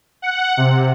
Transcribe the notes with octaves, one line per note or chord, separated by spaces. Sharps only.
F#5
C3